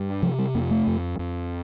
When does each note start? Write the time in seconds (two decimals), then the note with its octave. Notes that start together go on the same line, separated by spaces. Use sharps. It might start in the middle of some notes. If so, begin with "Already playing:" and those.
Already playing: G2
0.22 C3 F3
0.39 G3
0.55 F2 A#3
0.71 A3
0.87 F2
1.19 F2